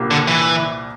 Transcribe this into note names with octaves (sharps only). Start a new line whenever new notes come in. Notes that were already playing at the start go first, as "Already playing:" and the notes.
Already playing: C2 A#2 G3 A#3 D4
D3
E3